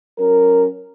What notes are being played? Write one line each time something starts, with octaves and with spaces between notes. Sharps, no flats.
F#3 C#4 A#4